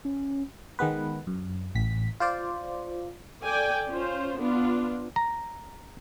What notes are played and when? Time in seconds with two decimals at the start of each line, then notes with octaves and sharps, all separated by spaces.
0.05 C#4
0.79 D#3 G#3 B3 B4
1.27 F#2
1.75 A1 B6
2.20 F4 C5 D5
3.42 A4 D5 G5 G#5
3.88 C#4 F4 C5
4.38 B3 D4 F4
5.16 A#5